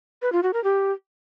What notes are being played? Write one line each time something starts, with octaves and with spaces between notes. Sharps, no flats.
B4
F4
F#4
A#4
G4